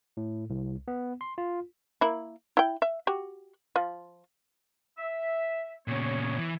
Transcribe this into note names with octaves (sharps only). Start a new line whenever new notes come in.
A2
C2
B3
C6
F4
A#3 E4
E4 G5
E5
F#4 G4
F3 F4
E5
A#2 C#3 B3 C#5
E3